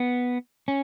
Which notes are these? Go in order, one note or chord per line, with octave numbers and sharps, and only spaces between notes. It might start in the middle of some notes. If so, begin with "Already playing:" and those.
Already playing: B3
C#4